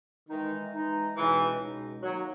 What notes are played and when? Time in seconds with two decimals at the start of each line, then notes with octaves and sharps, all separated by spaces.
0.29 D#3 E3 G#3 D#4
0.73 E3 G#3 D#4
1.16 C#2 B2 E3 G#3 D#4
1.59 C#2 B2 G#3 D#4
2.03 D#3 F#3 A#3 D#4